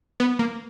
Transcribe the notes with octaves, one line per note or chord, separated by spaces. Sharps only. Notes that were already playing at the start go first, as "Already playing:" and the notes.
B3
A#3